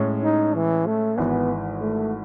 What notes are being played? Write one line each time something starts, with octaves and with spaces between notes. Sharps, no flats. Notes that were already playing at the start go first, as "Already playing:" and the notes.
Already playing: A2 G#3 C#4
D#4
E3
A3
G#1 G#2 E3 B3
A3